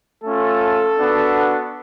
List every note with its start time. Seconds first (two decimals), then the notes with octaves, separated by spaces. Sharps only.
0.24 A3 C#4 F4 A4
0.99 B3 D4 F#4